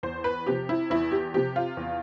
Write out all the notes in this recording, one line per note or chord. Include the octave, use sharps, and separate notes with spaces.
E2 C5
B4
C3 F3 G4
E4
E2 E4
G4
C3 F3 G4
F4
E2